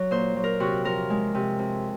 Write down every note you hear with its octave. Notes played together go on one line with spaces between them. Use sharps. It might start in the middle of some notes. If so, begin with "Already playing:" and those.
Already playing: F#3
A#2 C5
F#3
A#4
C3 F#4
F3 A#4
G#3
C3
F2